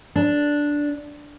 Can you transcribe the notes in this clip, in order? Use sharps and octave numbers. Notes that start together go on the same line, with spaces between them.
D4